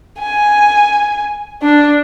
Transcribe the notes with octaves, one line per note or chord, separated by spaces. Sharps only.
G#5
D4